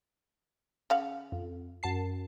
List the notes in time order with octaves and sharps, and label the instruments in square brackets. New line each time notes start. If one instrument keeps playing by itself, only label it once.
[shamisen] C#3 F5 F#5
[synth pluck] F2
F#2 A5 C7